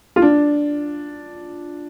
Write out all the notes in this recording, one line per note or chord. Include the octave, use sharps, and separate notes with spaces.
F4
D4